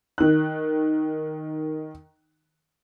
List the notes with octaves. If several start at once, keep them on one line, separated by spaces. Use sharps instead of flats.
D#3 F#6